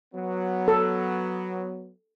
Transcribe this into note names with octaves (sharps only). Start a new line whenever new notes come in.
F#3 B3
A4